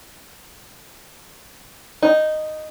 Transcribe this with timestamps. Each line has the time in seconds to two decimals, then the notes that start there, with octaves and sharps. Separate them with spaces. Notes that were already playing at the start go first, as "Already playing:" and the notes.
2.03 D#4